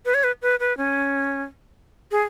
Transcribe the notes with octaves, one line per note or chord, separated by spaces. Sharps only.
B4
C#5
B4
B4
B4
C#4
G#4